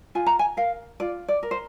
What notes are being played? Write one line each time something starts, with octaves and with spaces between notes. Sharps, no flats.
F4 G#5
A#5
G#5
A#4 F5
F4 D5
D5
A#4
C5